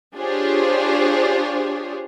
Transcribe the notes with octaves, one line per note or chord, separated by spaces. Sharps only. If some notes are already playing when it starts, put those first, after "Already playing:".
D4 F4 G4 G#4 C5 C#5